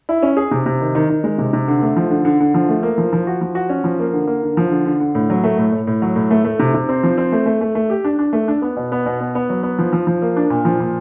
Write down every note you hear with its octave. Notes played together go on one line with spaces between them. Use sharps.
E4
C#4
G#4
C3
C3
D#3
D#3
D#3
G#3
C3
C3
D3
A3
F3
D3
D3
D3
F3
A3
A#3
F3
F3
F#4
F3
F#4
C#4
F3
A#3
D3
A#3
D3
F3
D3
D3
D3
A2
F#3
A3
A2
A2
A2
F#3
A2
A3
A3
C3
C3
C4
F3
C4
A3
A3
A3
A3
G4
D4
D4
A3
D4
B3
B2
B3
B2
B3
B3
F#3
B3
F3
F3
F3
A#3
D4
A#2
F3
A#2